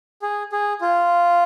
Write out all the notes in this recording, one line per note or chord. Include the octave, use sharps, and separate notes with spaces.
G#4
G#4
F4